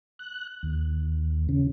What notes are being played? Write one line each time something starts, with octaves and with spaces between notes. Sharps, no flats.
F#6
D#2
C#3